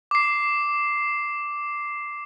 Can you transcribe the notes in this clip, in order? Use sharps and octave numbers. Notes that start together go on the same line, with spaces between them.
D6 C7